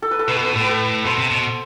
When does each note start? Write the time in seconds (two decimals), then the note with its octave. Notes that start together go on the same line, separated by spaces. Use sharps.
0.02 A4
0.11 B4
0.19 A4
0.27 B2 B4
0.36 A4
0.44 B4
0.53 A2 A4
0.61 B4
0.69 A4
1.05 B2 C5
1.18 C3
1.31 B2